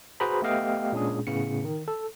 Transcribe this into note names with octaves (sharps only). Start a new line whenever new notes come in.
F#4 G#4 B4 C5 A#5 B5
A3 B3 G4 D#5 F5 G5
A#2 G#3 C#4 D4 G#4
A2 C#3 B3 C#7
D#3
A4